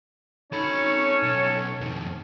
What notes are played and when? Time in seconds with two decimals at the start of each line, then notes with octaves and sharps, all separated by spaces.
0.53 C#4 D#4 A4 C#5 B5
1.23 B1
1.81 F2 D#3